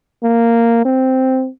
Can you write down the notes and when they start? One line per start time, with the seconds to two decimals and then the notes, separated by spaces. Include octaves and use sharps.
0.23 A#3
0.85 C4